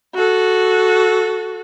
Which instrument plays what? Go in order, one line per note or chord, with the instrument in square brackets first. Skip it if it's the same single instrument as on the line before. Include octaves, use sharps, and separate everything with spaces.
[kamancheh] F#4 A4